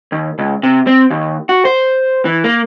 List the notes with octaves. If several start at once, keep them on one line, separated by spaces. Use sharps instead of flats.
D#2
C#2
C3
C4
D#2
F#4
C5
E3
A#3